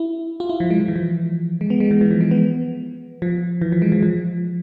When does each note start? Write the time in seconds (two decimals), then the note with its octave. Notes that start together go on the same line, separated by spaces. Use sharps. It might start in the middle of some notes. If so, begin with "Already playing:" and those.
Already playing: E4
0.40 F4
0.49 E4
0.60 F3
0.70 G#3
0.80 F3
0.88 E3
0.96 F3
1.61 G#3
1.70 B3
1.80 G#3
1.91 E3
2.01 E3
2.11 F3
2.21 G#3
2.31 B3
3.22 F3
3.61 E3
3.72 F3
3.82 G#3
3.92 F3
4.03 F3